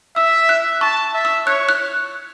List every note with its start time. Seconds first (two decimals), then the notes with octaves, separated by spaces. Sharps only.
0.16 E5 E6
0.49 F#6
0.81 A5 C#6
1.14 E5
1.25 E6
1.46 C#5 F#6
1.69 F#6